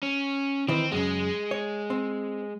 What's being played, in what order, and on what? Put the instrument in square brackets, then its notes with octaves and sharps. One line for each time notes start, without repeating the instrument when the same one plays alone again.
[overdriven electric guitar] C#4
[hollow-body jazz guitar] D#3 E3 [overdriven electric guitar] C4
[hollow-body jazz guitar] F#2 C#3 [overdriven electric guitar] G#3
[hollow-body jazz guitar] C#5
C4